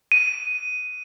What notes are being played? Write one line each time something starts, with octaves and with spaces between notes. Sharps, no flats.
D#7